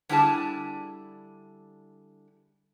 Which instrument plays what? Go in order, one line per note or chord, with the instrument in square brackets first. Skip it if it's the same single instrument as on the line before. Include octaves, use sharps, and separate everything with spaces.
[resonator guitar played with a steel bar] D3 G3 D4 E4 G#4 A5